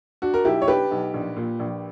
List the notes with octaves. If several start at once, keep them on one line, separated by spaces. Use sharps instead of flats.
D4 F#4
A#4
B1 E4 G4
C#5
D4 G4 B4
B1
A#1
A#2
A#1